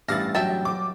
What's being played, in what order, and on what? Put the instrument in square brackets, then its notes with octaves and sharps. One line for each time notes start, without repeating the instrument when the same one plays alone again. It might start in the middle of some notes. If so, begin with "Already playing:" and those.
[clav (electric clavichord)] A1 G2 E4 [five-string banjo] F5 [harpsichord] A5 D6 [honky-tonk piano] A6 A#6
[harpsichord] F#3 [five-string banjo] E5 G5 A5
[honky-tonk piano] D6